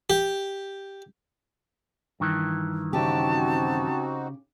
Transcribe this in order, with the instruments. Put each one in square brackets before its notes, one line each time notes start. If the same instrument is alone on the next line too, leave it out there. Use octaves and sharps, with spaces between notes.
[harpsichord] G4
[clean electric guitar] G2 D#3 E3
[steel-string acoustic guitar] C#3 G4 [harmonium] C4 D#4 F#4 [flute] A5